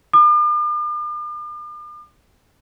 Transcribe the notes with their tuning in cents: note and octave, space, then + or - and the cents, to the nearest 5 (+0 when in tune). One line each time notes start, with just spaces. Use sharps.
D6 +45